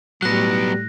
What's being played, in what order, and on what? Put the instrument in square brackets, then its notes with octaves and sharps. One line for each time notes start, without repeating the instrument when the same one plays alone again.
[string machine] A2 [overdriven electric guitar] F#3 B3 [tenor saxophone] G3 [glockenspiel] F#6 A#6